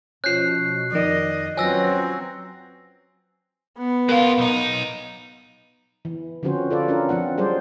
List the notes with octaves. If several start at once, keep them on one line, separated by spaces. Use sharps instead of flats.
B2 F3 C#4 F#6 G6 C7
F2 D#3 D5 D#5
F#3 C4 C#4 F4 B4 G#5 E6 A#6
B3
G#3 F4 A#4 F5
B1 D#4
E3
D3 F3 C4 C#4 F#4 C5
F4 A4 B4 D5
C#4 D4 F4 A#4
F3 C4 D4 F#5
F#3 G3 G#4 C5 D5